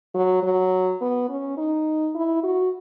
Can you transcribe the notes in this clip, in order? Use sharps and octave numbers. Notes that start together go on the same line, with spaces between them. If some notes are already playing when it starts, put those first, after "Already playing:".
F#3
F#3
B3
C#4
D#4
E4
F#4